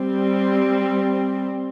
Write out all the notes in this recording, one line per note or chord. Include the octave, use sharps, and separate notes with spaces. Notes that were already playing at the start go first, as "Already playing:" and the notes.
Already playing: G3 C4